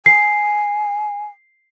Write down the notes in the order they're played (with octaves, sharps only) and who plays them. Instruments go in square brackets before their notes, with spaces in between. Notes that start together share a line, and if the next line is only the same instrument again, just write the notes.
[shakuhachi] G#5 [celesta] C7